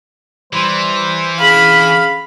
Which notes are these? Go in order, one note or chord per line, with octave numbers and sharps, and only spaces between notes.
E3 G3 C5
D2 C#4 G#4 F5 B5